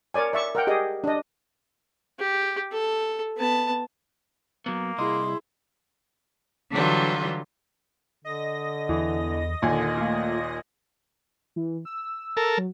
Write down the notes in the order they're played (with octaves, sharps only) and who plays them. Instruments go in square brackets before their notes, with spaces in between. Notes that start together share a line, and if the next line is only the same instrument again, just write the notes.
[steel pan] A#4 C#5 D5 G#5
D5 E5 C#6
A#4 F#5 G5
G4 G#4 D#5
D4 D#5
[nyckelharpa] G4
A4
B3 A5
[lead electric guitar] F#3 B3 [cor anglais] A#3
[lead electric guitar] C2 D#5 [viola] E4 G#4 [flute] C6
[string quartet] D3 E3 F#3 G3 F4
[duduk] D3 [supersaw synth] D#5 A#6
[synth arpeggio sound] E2 [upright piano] E3
[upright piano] D#2 A#2 G#5 [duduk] D3
[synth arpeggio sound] A3 F4 [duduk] A#3
[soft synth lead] E3
E6
[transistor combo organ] A4 A#4
[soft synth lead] F#3